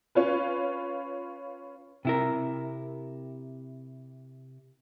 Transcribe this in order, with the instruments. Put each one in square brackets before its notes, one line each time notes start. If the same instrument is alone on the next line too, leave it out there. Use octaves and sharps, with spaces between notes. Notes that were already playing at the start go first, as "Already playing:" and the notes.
[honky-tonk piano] C#4 F4 B4
[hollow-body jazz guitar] C3 E4 A#4